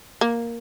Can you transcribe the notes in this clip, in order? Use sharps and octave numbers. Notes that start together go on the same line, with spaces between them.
A#3